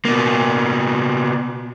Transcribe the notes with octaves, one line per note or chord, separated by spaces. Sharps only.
B2 A#3